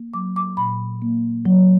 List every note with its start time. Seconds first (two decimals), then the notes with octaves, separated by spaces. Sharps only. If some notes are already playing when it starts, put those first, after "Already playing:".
Already playing: A#3
0.14 F#3 D6
0.36 D6
0.57 A#2 B5
1.02 A#3
1.45 F#3